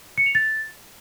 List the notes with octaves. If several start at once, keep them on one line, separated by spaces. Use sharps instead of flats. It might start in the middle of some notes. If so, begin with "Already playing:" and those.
C#7
F7
A6